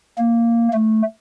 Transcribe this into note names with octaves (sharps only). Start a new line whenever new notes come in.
A#3
A3